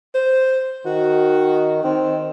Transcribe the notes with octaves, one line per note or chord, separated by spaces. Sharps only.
C5
D#3 F#4
D#3 C4